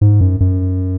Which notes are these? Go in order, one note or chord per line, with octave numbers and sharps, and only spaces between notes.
G#2
F#2
F#2